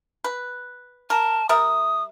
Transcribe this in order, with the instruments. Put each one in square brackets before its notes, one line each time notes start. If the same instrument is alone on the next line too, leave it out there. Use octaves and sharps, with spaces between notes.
[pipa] B4
[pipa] A#4 [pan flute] A5
[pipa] G3 A#4 E5 [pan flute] D#6